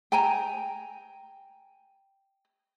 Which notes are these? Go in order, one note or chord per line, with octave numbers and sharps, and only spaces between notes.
G5 G#5 A#5